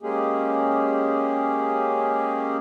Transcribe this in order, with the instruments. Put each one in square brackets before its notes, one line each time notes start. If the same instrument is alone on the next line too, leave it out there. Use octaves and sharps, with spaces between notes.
[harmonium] G#3 A#3 C#4 G4 G#4